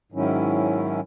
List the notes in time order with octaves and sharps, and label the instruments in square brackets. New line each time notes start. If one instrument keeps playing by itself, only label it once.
[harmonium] G#2 D#3 F#3 C#4 E4